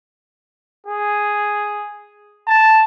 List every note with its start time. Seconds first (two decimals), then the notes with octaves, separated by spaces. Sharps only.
0.86 G#4
2.48 A5